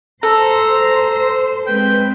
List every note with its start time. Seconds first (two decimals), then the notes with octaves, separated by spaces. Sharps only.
0.23 A4 C5 A#5
1.67 G#3 C4 B4 G5